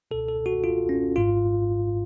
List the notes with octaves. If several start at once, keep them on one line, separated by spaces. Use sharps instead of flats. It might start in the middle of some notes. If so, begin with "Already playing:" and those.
C#2 B2 A4
A4
F#4
F4
C#4
G#1 G#2 F4